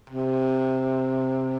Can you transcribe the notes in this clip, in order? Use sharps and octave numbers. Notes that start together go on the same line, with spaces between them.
C3